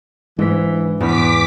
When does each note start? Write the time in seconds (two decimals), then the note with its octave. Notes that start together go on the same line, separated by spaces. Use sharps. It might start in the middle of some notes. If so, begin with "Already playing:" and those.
0.39 G#2 E3 G#3 D4 B6
1.00 E2 G#2 B3 D6 F6 B6